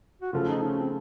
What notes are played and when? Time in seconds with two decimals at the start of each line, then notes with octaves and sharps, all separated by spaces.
0.22 F#4
0.33 C#3 F3 A3 F4
0.48 D#4
0.63 C#4
0.78 C4